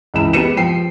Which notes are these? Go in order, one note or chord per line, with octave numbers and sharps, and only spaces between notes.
C#2 E3 E7
G#3 B3 G4 C#7 D#7 E7
F3 G5 C7